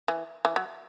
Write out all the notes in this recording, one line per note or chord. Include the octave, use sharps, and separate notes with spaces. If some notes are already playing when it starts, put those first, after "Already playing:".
E3
E3
F#3